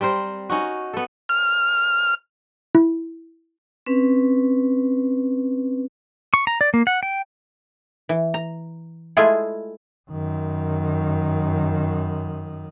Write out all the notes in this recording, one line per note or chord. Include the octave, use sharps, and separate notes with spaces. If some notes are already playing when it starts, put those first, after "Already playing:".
G3 C4 A#4 C5
C#4 D#4 F#4
B3 A4
F6
E4
C4 C#4 B4
C#6
A#5
D5
A#3
F#5
G5
E3
A#5
G#3 A3 E4 F4 G#4
F#2 D#3